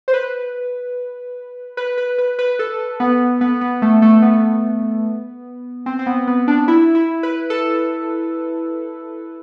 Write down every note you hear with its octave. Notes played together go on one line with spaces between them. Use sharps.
C5
B4
B4
B4
B4
B4
A4
B3
B3
B3
A3
A3
B3
C4
C4
B3
B3
D4
E4
E4
B4
A4